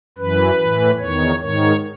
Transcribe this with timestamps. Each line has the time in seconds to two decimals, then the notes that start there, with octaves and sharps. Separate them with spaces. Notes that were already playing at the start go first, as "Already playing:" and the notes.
0.18 F#2 E3 B4
0.58 A2 E3
0.99 E2 D#3 C#5
1.40 G#2 D#3 C#5